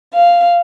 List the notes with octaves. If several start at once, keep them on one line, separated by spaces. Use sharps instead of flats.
F5